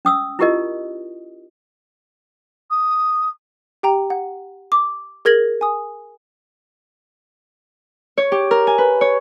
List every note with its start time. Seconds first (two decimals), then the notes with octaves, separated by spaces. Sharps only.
0.05 C#4 D#6 E6
0.39 E4 F4 G4 A#4 D#5
2.70 D#6
3.83 G4 G5 A#5
4.10 F#5
4.72 D6
5.25 G#4 A#4 G#6 A#6 F#7
5.61 G#5 D#6
8.17 C#5
8.32 G4
8.51 A#4
8.67 G#5
8.78 B4
9.01 C#5